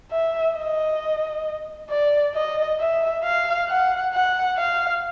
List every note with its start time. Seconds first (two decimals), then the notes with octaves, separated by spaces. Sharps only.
0.11 E5
0.57 D#5
1.90 D5
2.35 D#5
2.80 E5
3.23 F5
3.69 F#5
4.13 F#5
4.57 F5